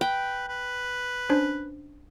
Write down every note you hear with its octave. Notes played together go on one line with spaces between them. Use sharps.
B4 G5
B4
C#4 D4 C5